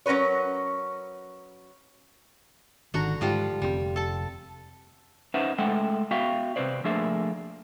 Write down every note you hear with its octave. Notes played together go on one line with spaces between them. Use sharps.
F#3 C#4 A#4 B4 C#5
G#1 D3 D#3 F#4 A#5
G#2 F3 G3 F4
F1 B2 G3 C4
A4 A5
C#4 D#4 B4 C5 E5 F#5
G#3 A3 A4 E5 F#5 G5
B3 F#4 E5 F5 G5
C3 G#3 C4 B4 C5 D5
F3 A3 A#3 D4 G#4 E5